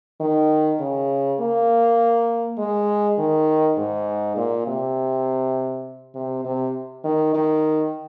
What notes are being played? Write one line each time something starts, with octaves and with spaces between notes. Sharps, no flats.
D#3
C#3
A#3
G#3
D#3
G#2
A#2
C3
C3
C3
D#3
D#3